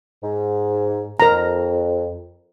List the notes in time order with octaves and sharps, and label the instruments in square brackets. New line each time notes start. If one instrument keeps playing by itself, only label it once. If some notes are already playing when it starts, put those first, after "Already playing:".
[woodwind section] G#2
[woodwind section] F2 [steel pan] A#4 A#5